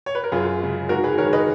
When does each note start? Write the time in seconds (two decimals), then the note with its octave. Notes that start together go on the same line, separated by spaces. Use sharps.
0.06 C#5
0.15 B4
0.24 A#4
0.32 F#2 F4 G#4
0.60 C#3 G#3
0.89 G#2 F#4 A#4
1.04 G#4 B4
1.18 D#3 G#3 A#4 C#5
1.33 B4 D#5